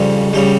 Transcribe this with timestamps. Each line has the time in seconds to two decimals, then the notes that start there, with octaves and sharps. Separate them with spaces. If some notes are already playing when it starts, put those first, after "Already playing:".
Already playing: F2 C#3 G3
0.33 C#3 G3